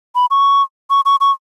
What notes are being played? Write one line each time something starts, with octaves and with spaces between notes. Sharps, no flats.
B5
C#6
C#6
C#6
C#6